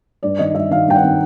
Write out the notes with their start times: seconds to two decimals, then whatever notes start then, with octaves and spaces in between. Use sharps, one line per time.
0.23 G2 D5
0.39 D#3 D#5
0.55 G2 E5
0.70 D#3 F5
0.87 G2 G5
0.96 F#5
1.03 D#3